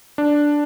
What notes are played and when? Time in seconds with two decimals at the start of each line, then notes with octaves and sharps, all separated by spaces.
0.18 D4